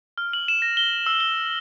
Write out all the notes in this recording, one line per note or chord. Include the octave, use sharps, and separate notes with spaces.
F6
F#7
E7
A#6
G7
E6
G7